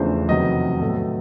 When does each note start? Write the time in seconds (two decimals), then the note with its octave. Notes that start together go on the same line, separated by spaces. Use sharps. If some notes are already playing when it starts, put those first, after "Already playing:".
Already playing: E2 C#3 F3 A3 D4 C5
0.29 F2 C3 D#3 F#3 B3 D#5
0.81 A2 F#3 B3 A4